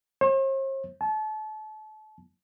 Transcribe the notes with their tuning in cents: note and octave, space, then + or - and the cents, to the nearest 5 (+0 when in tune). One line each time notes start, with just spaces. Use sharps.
C5 +45
A5 -35